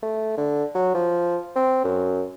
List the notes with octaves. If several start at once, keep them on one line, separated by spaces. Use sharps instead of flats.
A3
D3
F#3
F3
C4
F#2